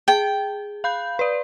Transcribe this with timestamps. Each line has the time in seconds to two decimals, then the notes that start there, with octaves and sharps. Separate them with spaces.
0.08 G#4 G5
0.84 F5 B5 G6
1.19 B4 D5